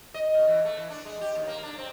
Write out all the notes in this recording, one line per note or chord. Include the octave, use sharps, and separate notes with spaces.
D#5
C#3
E3
A3
E3
D4
G#3
G4
D#2
A#3
D4
C4